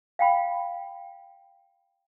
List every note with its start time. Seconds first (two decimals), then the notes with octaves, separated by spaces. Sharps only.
0.19 F5 G5 B5